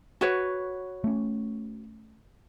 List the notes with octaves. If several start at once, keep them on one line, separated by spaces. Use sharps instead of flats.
F#4 B4 C#5
A3 C#4